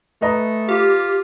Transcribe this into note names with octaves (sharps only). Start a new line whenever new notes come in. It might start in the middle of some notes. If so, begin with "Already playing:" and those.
A3 B4 D#5 A#5
F4 G4